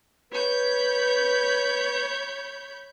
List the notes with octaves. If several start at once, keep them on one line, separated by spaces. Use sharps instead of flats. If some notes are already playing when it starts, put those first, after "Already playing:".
B4 C#5 B5 G6